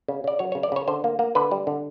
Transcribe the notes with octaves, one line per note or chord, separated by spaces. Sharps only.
C#3
C#3 D5
F#3 C#5
C#5
C#3
D5
C#3 C#5
D3 C5
A#3
A#3
D3 B4
G3
D3